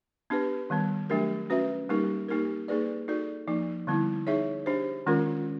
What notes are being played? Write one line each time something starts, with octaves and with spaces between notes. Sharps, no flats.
B3 D4 G4 B4
D#3 G3 B3
F#3 A3 D4 G4 A#4
C#4 F#4 B4 E5
G3 A#3 D#4 G4 A#4
A#3 D#4 G4 A#4
A#3 D#4 G#4 B4 D5
D#4 F#4 A4 D5
F3 A#3 D#4
D3 G3 B3 E4
D#4 G#4 C#5 E5
D4 G4 C5
D#3 G#3 C#4 F4 A#4